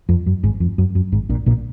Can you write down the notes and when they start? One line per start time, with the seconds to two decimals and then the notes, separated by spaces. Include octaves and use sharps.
0.09 F2
0.26 F#2
0.43 G#1 G#2
0.60 F2
0.78 F#2
0.95 F#2
1.12 G#1 G#2
1.29 A#1 A#2
1.46 A#1 A#2